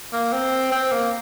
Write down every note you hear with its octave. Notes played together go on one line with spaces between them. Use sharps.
A#3
C4
C4
A#3